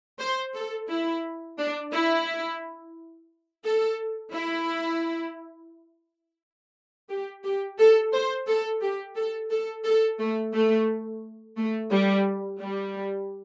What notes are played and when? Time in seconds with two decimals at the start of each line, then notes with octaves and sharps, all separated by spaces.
0.20 C5
0.55 A4
0.89 E4
1.58 D4
1.92 E4
3.65 A4
4.33 E4
7.09 G4
7.44 G4
7.79 A4
8.13 C5
8.47 A4
8.82 G4
9.16 A4
9.50 A4
9.85 A4
10.19 A3
10.54 A3
11.57 A3
11.91 G3
12.60 G3